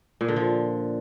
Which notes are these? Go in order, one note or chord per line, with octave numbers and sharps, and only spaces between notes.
A#2
D3
F3